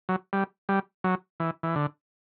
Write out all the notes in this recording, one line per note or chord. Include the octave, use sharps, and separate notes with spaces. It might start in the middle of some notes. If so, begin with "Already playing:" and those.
F#3
G3
G3
F#3
E3
E3
D3